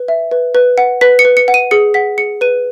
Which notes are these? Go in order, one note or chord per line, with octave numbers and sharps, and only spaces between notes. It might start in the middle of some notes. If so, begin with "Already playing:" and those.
Already playing: B4
E5
B4
B4
F#5
B4 B6
C#7
B4
C#7
F#5
D#7
G#4 C#7
F#5 B6
G#4 C#7
B4 D#7